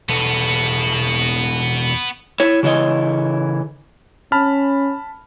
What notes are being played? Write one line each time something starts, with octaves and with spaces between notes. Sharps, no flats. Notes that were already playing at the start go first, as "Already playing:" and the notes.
E2 B2 B3 F#4 A4
E4 C#5
C#3 E3 C#5 D#5
C#4 A5 B5 F6